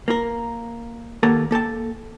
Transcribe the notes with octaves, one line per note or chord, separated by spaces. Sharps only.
A#3 A#4
D#2 A#3 A4 A#4 F#5 A5
A#3 A4 G5 A5